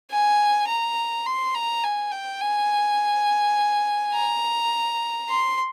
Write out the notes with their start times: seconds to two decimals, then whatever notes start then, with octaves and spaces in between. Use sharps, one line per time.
0.11 G#5
0.68 A#5
1.26 C6
1.55 A#5
1.84 G#5
2.12 G5
2.41 G#5
4.13 A#5
5.29 C6